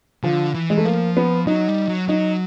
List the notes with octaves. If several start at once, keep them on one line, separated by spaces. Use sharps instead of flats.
D3 F3
E3
G#3
A3
F3 A#3
B3
F#3 D#4
G3
F#3
F#3 D#4